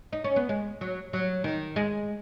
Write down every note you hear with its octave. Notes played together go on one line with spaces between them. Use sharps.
D#4
C#4
B3
G#3
F#3
F#3
D#3
G#3